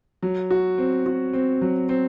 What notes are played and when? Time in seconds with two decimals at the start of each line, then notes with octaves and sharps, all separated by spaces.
0.22 F#3
0.50 F#4
0.78 C4
1.06 F#4
1.33 C4
1.62 F#3
1.89 C4